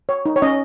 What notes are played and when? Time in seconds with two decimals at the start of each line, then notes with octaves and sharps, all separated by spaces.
0.09 C#5
0.26 D#4
0.36 C#5
0.42 C#4 D#5